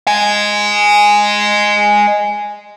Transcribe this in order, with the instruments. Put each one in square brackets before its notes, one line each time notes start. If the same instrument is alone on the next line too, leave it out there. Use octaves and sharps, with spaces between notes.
[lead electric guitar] D#5 G#5